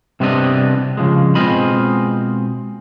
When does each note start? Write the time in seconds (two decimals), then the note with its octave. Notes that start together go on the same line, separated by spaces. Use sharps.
0.20 C3 G3 B3 C4 D4 D#5
0.97 C#3 F3 G#3
1.35 B2 G#3 C4 F4 D#5 B5